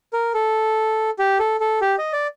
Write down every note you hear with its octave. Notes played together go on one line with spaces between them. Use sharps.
A#4
A4
G4
A4
A4
G4
D#5
D5